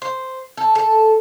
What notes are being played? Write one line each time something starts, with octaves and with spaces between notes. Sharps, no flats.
C5
A4
A4